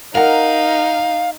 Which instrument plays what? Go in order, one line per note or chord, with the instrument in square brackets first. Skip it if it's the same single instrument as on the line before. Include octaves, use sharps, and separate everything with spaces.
[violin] D#4 [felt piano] A#4 F#5 [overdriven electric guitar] F5